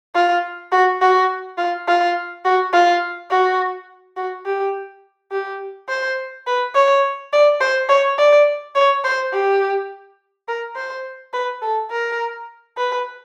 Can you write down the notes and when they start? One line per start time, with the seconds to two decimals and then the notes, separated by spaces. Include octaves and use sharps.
0.15 F4
0.72 F#4
1.01 F#4
1.58 F4
1.88 F4
2.45 F#4
2.73 F4
3.30 F#4
4.17 F#4
4.46 G4
5.32 G4
5.89 C5
6.47 B4
6.75 C#5
7.32 D5
7.61 C5
7.89 C#5
8.18 D5
8.75 C#5
9.04 C5
9.33 G4
10.48 A#4
10.76 C5
11.33 B4
11.62 A4
11.91 A#4
12.78 B4